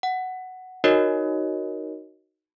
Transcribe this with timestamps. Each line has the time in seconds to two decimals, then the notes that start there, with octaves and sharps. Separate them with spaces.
0.03 F#5
0.84 D#4 F#4 A#4 C#5 D#5